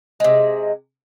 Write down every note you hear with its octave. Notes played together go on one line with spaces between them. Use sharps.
C3 G#3